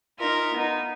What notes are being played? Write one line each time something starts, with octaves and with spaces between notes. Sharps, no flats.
D#4 F4 A#4 E5
B3 D#4